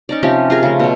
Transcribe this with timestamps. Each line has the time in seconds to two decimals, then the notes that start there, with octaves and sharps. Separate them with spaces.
0.09 C#4 D#4 D5
0.23 C3 F3 C#4 G4
0.50 F4 G#4 A#4
0.63 C#3 A3
0.80 B2 F#3